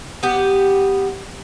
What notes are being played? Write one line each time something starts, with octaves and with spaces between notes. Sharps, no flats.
B3 G4